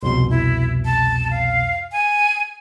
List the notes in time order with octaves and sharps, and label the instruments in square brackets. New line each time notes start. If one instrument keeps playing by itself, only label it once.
[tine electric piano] C2 F2 B2 [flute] C6
[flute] E4
A5
F5
G#5